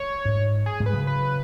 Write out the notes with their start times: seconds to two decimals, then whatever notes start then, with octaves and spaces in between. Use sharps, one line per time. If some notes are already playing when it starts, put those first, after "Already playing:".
Already playing: C#5
0.25 G#2
0.66 G#4
0.80 G#2
0.86 B4
0.93 C#3 F#3
1.07 B4